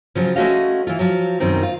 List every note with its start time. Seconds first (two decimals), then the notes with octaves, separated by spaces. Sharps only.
0.15 C#3 F3 F#3
0.36 G#3 A3 C#4 F#4 D#5 F5
0.87 E3 F4
0.99 F3 F#3
1.40 F#2 B2 D#3 C4
1.63 F4